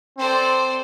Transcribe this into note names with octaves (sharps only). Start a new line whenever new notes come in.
C4 A4 C5 D5